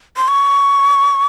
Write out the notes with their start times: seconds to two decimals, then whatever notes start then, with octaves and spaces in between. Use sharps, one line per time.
0.17 C6
0.28 C#6